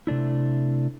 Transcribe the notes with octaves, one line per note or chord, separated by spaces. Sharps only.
C3 A3 D4 E4